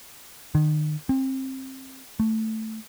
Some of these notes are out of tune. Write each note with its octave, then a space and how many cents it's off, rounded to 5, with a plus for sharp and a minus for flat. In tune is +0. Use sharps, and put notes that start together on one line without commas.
D#3 -35
C4 +25
A3 +5